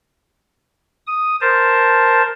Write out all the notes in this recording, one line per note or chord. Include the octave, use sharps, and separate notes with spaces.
D#6
A#4 C5 A5